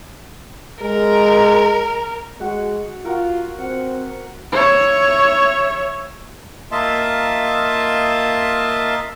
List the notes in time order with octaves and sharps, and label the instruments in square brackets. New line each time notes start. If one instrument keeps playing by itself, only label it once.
[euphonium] G#3 [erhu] A#4
[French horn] G#3 [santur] F#4 F#5
[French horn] F4 [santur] F#4 A#4
[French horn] C4 [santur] F#5
[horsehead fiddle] C#5 E5
[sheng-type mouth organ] A#3 F4 D#5 E5 A5 C6